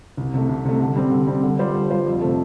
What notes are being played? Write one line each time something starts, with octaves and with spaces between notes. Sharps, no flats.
C2
C3 A3
C2
C3 A3
D3
G3 C4
D3
G3 C4
D3
G3 F4 C5
D3
G3 F4 C5
F2
C3 A3